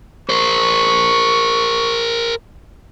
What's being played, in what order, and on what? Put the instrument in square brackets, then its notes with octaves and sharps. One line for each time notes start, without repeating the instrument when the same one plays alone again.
[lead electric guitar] A#4 C5 [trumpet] C#6